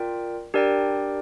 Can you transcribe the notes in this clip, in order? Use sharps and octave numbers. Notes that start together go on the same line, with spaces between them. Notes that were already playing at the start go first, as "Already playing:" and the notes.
Already playing: F4 A#4 D5 G5
D4 G4 A#4 D5 G5